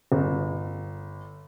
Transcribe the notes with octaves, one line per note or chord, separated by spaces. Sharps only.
G1